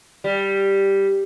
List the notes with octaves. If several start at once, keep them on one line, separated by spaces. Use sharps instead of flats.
G3